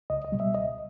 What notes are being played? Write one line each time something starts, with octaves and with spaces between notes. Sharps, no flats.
C#2 D#5
D#5
B2 G3
E5
C#2 D#5